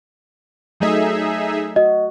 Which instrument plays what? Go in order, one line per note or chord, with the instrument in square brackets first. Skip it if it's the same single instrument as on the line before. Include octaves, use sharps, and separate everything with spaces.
[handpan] F#3 A3 D#5 [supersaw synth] D#4 G#4 E5
[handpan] F#4 [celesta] D#5